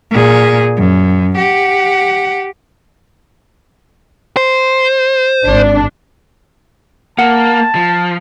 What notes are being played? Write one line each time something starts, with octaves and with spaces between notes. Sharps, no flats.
A#2 G#4
F#2
G4 F#5
C5
G#1 D4
A#3 F#5 A5
F3